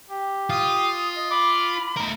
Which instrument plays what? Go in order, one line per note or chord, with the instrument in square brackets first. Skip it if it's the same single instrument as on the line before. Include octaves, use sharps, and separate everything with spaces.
[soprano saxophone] G4
[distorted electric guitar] F4 [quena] D#6
[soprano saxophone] D#5
[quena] B5 [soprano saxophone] D6
[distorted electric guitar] A3 A#4 [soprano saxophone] D#4